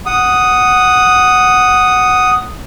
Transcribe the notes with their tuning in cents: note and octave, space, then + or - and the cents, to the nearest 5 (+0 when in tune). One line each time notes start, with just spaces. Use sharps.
F#5 +0 D#6 +0